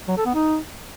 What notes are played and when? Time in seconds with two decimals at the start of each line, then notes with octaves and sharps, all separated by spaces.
0.08 F#3
0.17 A4
0.26 B3
0.35 D#4